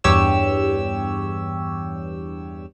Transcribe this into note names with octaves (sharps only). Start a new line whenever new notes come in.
E2 G2 G4 C#5 E6